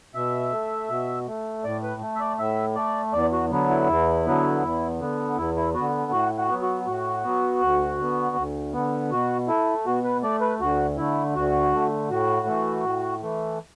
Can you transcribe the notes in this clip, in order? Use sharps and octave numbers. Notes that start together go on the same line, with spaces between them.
B2 E5
A3
B2
A3
A2 D5
B4
A3
E5
D5
A2 E5
A3 D5
E2 D5
F#4
D3 F#3 B3
E4
E2
D3 F#3 B3
E2
D3 B3
E2 E4
E4
D3 B3 F#4
A2 F#4
F#4
F#3 B3
F#4
A2 F#4
F#3 B3
D2
D3 B3
D2
D3 B3
B2 F#4
A3 E4
B2 F#4
B4
A3 D5
B4
D2 F#4
D3 A3 E4
D2 F#4
D3 A3
A2 F#4
E3 A3
A2
E3 A3